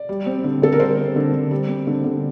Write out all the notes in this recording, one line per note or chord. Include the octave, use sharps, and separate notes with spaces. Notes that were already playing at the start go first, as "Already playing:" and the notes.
Already playing: D5
G3
C4
D3
D3 A4
A#4
G3 C5
C4
D3
D3
G3
C4
D3
D3